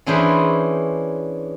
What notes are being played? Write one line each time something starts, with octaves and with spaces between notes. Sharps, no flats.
E3 C#4 D4 G#4 B4 C5